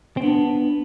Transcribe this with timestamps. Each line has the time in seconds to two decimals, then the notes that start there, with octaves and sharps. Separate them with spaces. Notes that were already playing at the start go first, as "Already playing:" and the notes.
0.17 C4
0.23 B3 D4